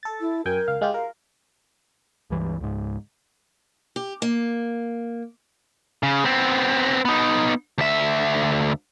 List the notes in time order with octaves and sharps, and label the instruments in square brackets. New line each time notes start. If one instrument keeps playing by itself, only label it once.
[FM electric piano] A4 A6
[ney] E4
[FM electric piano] F#2 G5 G#5 [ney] A#4
[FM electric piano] C#2 F5
G#3 F4 G4
[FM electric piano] A#4 [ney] F5
[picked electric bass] C#2 G2 E3
C#2 G#2
[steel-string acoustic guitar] G4
A#3
[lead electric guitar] C#3
B3 C4
B3 D#4
D2 E5